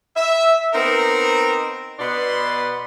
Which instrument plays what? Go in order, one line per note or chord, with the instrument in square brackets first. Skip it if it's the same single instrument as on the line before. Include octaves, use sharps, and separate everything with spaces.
[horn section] E5
B3 C4 D#4 A#4
B2 B3 B4 D5 C6